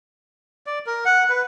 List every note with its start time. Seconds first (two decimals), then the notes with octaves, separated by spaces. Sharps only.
0.66 D5
0.86 A#4
1.05 F#5
1.30 B4